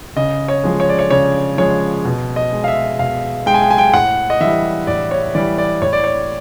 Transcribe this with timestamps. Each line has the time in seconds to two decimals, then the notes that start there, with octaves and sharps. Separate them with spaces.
0.16 C#3 D#5
0.48 C#5
0.64 F3 G#3
0.80 C#5
0.89 D5
0.99 C#5
1.10 C#3 C#5
1.58 F3 G#3 C#5
2.05 B2
2.36 D#5
2.52 G#3
2.64 F5
2.68 E5
2.99 B2 F5
3.46 G#3 G5
3.54 G#5
3.62 G5
3.70 G#5
3.78 G5
3.93 A2 F#5
4.30 D#5
4.40 E3 G3 E5
4.87 A2 D5
5.11 C#5
5.35 E3 G3 D5
5.58 D5
5.82 A2 C#5
5.93 D5
6.04 C#5